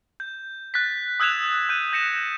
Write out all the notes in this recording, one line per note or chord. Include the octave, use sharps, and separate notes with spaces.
G6
F#6 A6 B6
D#6 E6 F#6 G#6 E7 F7
F#6 G6 D#7
G6 A#6 C#7 E7